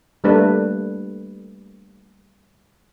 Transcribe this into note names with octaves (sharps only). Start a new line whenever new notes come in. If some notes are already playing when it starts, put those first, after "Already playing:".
G3 A3 A#3 D4 A4 B4